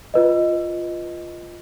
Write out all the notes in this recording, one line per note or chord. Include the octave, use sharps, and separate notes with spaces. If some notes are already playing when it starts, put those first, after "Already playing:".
F4 B4 D#5